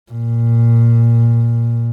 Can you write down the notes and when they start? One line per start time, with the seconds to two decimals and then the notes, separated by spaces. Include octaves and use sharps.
0.12 A#2